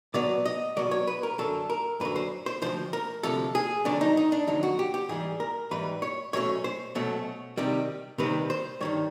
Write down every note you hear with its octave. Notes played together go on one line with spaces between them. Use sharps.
B2 F#3 B3 D5
D#5
B2 F#3 B3 D5
C#5
B4
A#4
F#2 D3 F#3 A4
A#4
F#2 D3 F#3 B4
C5
C5
D2 C3 F3 C5
A#4
D2 C3 F3 A4
G#4
F2 D3 F#3 D4
D#4
D#4
D4
F2 D3 F#3 D#4
F#4
G4
G4
G#2 E3 G3 G#4
A#4
G#2 E3 G3 B4
C#5
B2 F#3 A3 C#4 C#5
C5
B2 F#3 A3 C#4
C3 D#3 G3 C4
C3 D#3 G3 C4 B4
C5
G2 D#3 G3 C#5